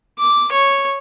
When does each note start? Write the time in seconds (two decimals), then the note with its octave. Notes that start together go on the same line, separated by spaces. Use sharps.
0.19 D6
0.52 C#5